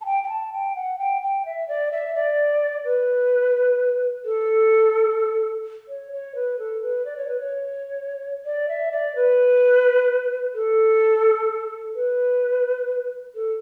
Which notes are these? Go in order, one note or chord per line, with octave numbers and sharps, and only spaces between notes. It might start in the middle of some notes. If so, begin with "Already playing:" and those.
A5
G5
G5
A5
G5
F#5
G5
G5
E5
D5
E5
D5
B4
A4
C#5
C#5
B4
A4
B4
D5
C#5
B4
C#5
D5
E5
D5
B4
A4
B4
A4